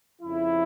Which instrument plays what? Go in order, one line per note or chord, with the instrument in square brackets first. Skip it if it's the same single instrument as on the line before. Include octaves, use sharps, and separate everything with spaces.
[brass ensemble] F2 C#3 F3 E4